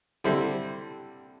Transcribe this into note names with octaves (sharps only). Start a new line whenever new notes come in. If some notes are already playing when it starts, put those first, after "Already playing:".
D3 G3 C4 E4